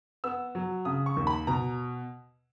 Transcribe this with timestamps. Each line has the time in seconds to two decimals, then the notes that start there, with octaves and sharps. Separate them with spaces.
0.24 B3 E6
0.55 F#3
0.85 C#3 D#6
1.06 C#6
1.17 D#2
1.27 B5
1.47 B2 A#5